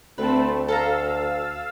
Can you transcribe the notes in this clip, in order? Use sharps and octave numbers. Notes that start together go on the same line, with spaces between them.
D2 A3 C4 B4 A5
A4 F5 A5 A#5 E6 A6